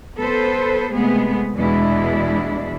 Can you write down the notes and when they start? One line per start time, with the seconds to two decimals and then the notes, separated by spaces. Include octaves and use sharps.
0.19 B3 A4 B4 C5
0.94 C3 G#3 A3 B3 G#4
1.55 E2 B2 E3 G#3 D4 E4